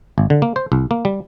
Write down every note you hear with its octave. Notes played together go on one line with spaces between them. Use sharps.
G#1
D3
A#3
C5
C2
A#3
G3